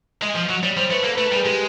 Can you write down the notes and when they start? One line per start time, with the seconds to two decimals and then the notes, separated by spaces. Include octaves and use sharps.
0.22 G#3 D#5
0.35 F3
0.49 F#3
0.63 G3 C#5
0.77 G3 C5
0.90 A3 B4
1.04 A#3 A4
1.15 A3 B4
1.24 A#4
1.32 G3
1.35 G#4
1.45 G#3 G4